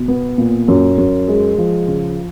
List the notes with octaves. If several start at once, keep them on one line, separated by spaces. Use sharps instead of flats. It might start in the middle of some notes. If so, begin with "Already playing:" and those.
Already playing: B2
B3
A#2
F#2
F#2
G#3
F3
C#3